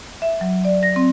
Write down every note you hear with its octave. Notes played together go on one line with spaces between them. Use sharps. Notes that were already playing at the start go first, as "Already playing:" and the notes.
E5
F#3
D5
A#6
C4